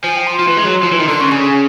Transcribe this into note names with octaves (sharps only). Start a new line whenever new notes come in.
F3 G#5
G5
C6
F3
E3
G#3
F#3
F3
E3
D#3
D3 C6
C#3 C#6
C#3 G#5
G#5